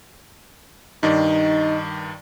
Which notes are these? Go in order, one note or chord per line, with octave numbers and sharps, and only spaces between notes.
G2 D#3 D#4 D5